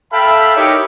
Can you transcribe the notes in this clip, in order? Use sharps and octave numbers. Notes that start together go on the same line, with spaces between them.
A4 E5 F5 G5 A5 B5
D#4 E4 G4 A#4 C#5